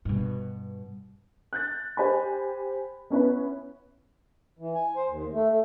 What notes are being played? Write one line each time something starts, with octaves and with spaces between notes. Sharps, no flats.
G2 B2
F#6 G6 A6
G4 C5 G#5 B5
B3 C#4 E4 B4
E3
G#5
C5
D#2
A3
A3